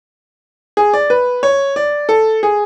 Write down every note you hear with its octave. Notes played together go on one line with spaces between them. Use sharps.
G#4
D5
B4
C#5
D5
A4
G#4